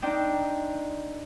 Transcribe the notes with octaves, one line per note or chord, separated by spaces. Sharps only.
C4 D4 D#4 G5